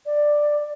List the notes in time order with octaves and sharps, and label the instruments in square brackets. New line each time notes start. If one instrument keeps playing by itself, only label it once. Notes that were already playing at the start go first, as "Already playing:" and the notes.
[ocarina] D5